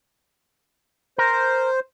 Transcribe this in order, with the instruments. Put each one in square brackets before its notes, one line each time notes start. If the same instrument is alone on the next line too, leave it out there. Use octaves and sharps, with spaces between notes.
[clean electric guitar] A#4 [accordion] C5